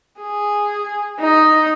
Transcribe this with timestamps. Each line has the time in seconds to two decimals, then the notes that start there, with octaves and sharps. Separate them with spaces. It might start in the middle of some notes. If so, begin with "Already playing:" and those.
0.20 G#4
1.20 D#4